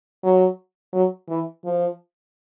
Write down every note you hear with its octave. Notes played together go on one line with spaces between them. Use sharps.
F#3
F#3
E3
F3